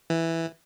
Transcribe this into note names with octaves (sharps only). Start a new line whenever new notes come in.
E3